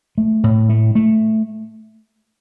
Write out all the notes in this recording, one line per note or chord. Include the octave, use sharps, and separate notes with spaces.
A3
A2
A3
A3